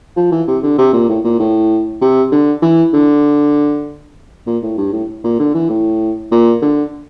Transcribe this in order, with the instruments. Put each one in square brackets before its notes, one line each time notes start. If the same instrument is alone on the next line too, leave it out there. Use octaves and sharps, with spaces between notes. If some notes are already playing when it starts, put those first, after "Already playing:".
[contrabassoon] F3
E3
C3
D3
C3
A#2
A2
A#2
A2
C3
D3
E3
D3
A#2
A2
G2
A2
A#2
D3
E3
A2
A#2
D3